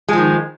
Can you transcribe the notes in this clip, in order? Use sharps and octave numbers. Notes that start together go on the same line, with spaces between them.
D#3 F3 G#3